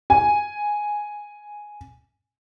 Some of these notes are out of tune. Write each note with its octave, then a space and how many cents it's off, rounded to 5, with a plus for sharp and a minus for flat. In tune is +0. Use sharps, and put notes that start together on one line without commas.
G#5 -5